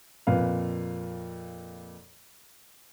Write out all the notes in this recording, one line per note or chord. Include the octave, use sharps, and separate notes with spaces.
F2 A#2 B4 F5